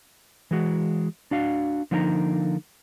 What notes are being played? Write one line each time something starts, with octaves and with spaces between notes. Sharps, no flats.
E3 G#3 F#4
D4 F#4 F5
D3 F3 A#3 D#4 G5 A#5